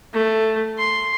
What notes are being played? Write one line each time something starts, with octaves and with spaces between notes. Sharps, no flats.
A3
C6